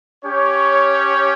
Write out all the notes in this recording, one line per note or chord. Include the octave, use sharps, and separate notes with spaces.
C#4 G4 C#5